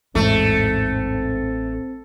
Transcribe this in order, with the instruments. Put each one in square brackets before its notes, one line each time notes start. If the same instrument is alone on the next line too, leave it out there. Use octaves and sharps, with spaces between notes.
[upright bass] A1 [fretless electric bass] E2 G#2 [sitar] A3 [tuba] C4